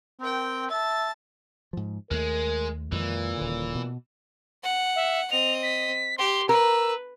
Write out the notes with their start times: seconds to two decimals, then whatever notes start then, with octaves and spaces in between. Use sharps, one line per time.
0.20 C4 A#4 G5
0.70 E5 A5 A6
1.73 G#2 F3
2.11 D#2 G#3 A3 A#4
2.92 F2 A#2 D#3 E3 G#3
3.37 D#1 D3
3.75 B2
4.63 F#5
4.96 E5
5.31 C4 D#5 F7
5.63 B6
6.18 G4 C6
6.49 A#4 B4 E6